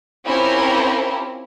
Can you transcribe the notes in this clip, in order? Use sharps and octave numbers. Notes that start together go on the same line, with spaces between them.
C4 C#4 E4 F4 G4 A#4